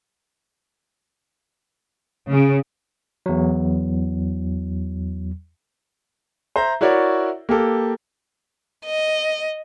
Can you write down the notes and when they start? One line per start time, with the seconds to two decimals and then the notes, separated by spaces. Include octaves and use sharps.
2.28 C#3
3.26 E2 F#3
6.56 C5 E5 A#5
6.81 E4 F#4 A#4 C#5 D5 E5
7.49 A#3 G4 A4
8.85 D#5